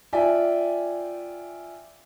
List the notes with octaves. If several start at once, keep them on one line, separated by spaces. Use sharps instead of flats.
F4 D5 E5 G5 G#5